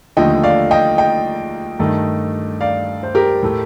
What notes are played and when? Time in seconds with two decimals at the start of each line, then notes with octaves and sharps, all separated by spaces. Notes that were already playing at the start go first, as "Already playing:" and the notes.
0.17 D#2 D3 F3 A3 D#5 G5
0.43 D5 F5
0.71 D#5 G5
0.98 D#5 G5
1.79 G2 D#3 A3
2.61 D5 F5
3.03 C5
3.15 G4 A#4
3.43 A2 A3